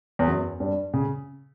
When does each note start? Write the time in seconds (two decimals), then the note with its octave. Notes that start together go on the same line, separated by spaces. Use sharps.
0.19 E2
0.27 F#2
0.60 G2
0.94 C#3